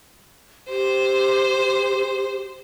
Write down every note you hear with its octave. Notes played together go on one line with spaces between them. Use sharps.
G4 C5